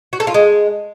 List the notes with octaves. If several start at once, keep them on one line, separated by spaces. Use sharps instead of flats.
F#4
A4
F4
G#3